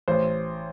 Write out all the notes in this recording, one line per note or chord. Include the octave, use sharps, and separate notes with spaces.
A1 C5